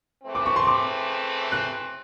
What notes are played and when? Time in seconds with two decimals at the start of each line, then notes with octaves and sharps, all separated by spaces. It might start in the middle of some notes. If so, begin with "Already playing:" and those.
0.24 C#3 E3 A3 C4
0.35 D6
0.46 C#6
0.56 C6
0.67 D6
1.52 F#6